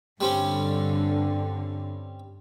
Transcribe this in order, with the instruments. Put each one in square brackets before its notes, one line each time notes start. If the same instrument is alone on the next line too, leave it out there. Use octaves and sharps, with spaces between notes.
[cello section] G2 D3 [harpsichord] G3 C4 C#4